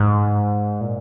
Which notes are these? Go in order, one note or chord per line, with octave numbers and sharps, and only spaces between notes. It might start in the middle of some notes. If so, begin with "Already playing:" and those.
Already playing: G#2
A#2